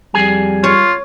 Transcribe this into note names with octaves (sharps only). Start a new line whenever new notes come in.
F2 G3 G#4 G#5
F4 C#5